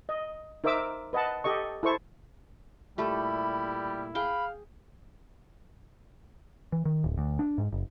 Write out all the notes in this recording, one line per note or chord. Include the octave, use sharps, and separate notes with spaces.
D#5
D#4 A#4 C5 E5 D6 E6
B4 D#5 F#5 A5
G4 A4 D#5 C#6
E4 A4 C5 C#6
A#2 G3 A3 E4 G4 A4 B5
G#4 F5 G5 B5
E3
D#3
D1
D2
D4
G#2
F#1